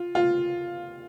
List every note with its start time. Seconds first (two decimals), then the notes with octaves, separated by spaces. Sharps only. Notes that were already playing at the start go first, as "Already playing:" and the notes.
Already playing: F4
0.15 F4